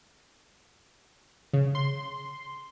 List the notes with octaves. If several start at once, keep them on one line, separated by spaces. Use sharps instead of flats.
C#3
C6